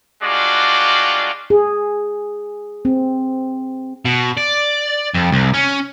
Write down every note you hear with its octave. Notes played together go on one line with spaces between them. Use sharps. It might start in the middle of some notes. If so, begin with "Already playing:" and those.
G3 G#3 D4 F4 F#4 D5
G#4
C4
B2
D5
F2
C2
C#4